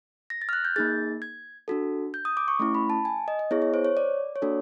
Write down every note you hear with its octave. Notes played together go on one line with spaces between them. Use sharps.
A#6
A6
F6
F#6
G6
A#3 D#4 G#4 A6
G#6
D4 F#4 A4
G6
D#6
D6
C#6
A3 C#4 E4
B5
A5
G#5
D#5
D#5
B3 E4 G#4 C#5
C#5
C5
C#5
D5
C#5
A#3 D4 F#4 A4 D5